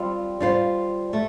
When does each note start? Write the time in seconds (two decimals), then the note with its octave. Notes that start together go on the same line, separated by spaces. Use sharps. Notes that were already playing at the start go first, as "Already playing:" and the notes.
Already playing: G3 C4 F4
0.40 G3 F4 C5
1.13 A3